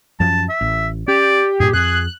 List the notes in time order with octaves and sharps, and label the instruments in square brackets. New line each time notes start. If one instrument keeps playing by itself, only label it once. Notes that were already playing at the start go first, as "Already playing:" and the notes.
[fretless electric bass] F#2 F3 C#4 [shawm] A5
[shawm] E5
[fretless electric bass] A1
[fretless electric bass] C#4 [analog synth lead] G4 [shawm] D5
[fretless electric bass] G2 A#2 [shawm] G#4
[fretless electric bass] F2 [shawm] G#4 [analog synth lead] F#6